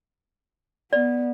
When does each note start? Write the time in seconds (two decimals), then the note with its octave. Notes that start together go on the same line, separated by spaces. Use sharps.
0.93 B3 D5